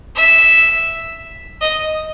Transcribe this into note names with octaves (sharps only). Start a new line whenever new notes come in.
E5
D#5